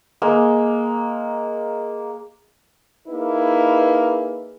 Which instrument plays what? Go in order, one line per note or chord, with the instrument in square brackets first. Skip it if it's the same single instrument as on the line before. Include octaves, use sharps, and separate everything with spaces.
[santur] G#3 A#3
[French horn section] A#3 D#4 E4 G#4 B4